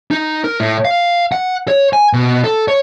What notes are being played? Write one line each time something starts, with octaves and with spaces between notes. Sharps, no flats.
D#4
A#4
A2
F5
F#5
C#5
G#5
B2
A4
C#5